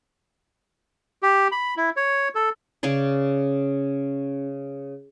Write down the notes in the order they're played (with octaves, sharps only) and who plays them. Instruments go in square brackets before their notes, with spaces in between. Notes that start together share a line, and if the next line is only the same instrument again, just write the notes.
[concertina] G4
B5
E4
C#5
A4
[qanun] C#3 C#4 G#4 D5